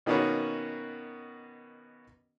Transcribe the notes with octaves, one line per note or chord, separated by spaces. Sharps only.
B2 D#3 A#3 B3 C#4 F#4